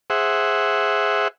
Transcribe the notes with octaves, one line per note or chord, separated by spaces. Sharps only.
G#4 C5 E5 F#5